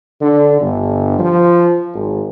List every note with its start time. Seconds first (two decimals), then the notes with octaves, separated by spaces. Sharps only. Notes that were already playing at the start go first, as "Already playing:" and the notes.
0.21 D3
0.61 G1
1.19 F3
1.94 G#1